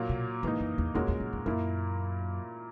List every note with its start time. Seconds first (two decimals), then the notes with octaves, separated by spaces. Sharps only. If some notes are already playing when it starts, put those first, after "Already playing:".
Already playing: A#2 F#3 A#3
0.09 B2
0.43 G#2 E3 A#3 D#4
0.60 F#2
0.78 E2
0.95 E2 A#2 G#3 C#4 F#4 A#4
1.08 E2
1.20 F#2
1.33 E2
1.46 F#2 A#2 A#3 E4 A#4